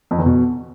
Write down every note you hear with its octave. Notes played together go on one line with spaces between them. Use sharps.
F2
E2
B2